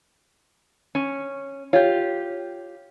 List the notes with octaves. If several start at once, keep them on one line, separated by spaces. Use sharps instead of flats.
C#4
F4 G4 C#5